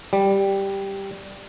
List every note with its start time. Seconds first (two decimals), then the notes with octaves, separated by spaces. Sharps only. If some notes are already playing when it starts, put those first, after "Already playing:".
0.13 G3